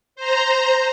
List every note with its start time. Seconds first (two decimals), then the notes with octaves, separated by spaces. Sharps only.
0.16 C5 A#5